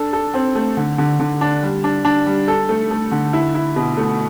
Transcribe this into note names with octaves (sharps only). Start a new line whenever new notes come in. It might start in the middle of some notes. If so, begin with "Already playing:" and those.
Already playing: D4 A4
A4
C4
A3
D3
D3
D3
D4
G3
D4
D4
G3
A4
A3
A3
D3
E4
E4
B2
A3